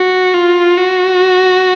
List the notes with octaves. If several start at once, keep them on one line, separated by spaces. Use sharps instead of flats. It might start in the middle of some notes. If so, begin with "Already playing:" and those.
Already playing: F#4
F4
F#4